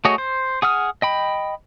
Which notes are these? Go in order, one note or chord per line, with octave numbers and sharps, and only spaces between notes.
A3 F#4 G#4 C#5 D#5
C5
G#4 F#5 D#6 F6
D#5 G5 B5